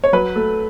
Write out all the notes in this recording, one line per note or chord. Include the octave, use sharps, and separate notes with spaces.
C#5
F#3 B4
A3